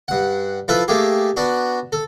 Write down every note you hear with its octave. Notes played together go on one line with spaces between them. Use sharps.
G2 F#5
F3 E4 F4 A4 B4
A3 A#3 G4 G#4
B3 D4 F#4
A4